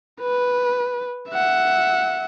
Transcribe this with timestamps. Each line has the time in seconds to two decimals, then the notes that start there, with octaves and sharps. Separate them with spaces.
0.21 B4
1.30 E5 F#5